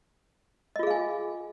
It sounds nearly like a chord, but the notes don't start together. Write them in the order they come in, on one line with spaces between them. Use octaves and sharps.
D#5 F4 G#4 F5 G#5